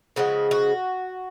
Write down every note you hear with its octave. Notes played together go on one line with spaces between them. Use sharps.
C#3 F3 G#3 F#4
F#4